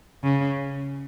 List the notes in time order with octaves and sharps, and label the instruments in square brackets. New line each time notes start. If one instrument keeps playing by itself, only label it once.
[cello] C#3